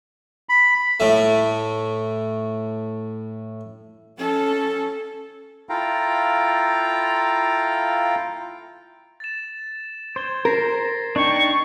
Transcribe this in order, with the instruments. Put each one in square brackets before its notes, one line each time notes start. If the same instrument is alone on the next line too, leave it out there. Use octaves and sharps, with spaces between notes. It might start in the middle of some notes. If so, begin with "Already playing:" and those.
[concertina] B5
[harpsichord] A2 A3
[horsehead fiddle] C#4 A4
[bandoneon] E4 F4 A4 F5 G5 A#5
[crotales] A6 E7
[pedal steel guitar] C5 [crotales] G#6 G7
[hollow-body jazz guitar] A#4 [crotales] A6 A#6 C7
[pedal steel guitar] D4 D#4 G5 [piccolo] C#6